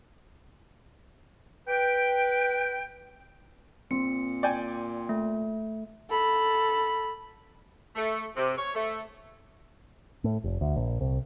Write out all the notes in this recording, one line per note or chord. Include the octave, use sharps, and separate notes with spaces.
B4 G5
A#2 C4 C#7
D5 G5 G#5
A3
A4 B5
A3
C3
C#5
A3
A2
F1
D2
A#1
C2